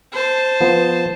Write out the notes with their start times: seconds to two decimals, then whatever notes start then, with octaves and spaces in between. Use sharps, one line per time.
0.13 C5 A5
0.61 F3 B3